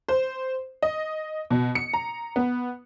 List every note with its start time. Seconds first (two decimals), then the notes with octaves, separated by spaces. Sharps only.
0.08 C5
0.83 D#5
1.51 B2
1.75 C#7
1.93 A#5
2.36 B3